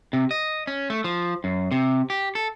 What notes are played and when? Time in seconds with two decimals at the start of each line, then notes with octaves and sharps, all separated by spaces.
0.13 C3
0.31 D#5
0.67 C#4
0.90 A3
1.04 F3
1.44 F#2
1.71 C3
2.10 G4
2.35 A4